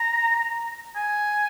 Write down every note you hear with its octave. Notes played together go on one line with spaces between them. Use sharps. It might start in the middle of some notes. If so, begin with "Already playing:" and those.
Already playing: A#5
G#5